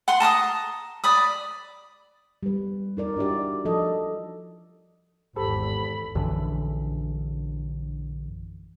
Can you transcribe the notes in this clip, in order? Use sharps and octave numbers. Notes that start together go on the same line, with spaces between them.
F#5 C6
A5 A#5 D6 D#6
D5 B5 D#6
G3 B4
D#4 A#4 D5
D4 E4 F#4 G4 D5
F3 A4 D#5
G#1 E2 G4 A4 C5 B5
A#1 F#2 D3 E3